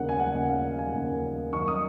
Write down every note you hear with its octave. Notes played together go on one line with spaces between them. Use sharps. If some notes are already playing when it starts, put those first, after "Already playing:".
Already playing: D#2 C#3 F#5
G#5
F#5
D#2 C#3
F5
G#5
D#2 C#3
F#2 D#3 C#6
D#6